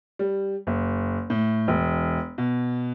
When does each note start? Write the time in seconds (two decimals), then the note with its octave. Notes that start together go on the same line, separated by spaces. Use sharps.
0.19 G3
0.67 F#1
1.30 A2
1.68 E1
2.38 B2